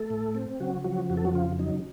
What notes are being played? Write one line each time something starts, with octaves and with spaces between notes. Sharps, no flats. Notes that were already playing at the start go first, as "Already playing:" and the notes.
Already playing: A3 A4
A2
C4
C#3 F#3 F#4
F3 F#3 F#4
F2 F#4
A4
F#3 F#4
C#3 F4
F#3 D#4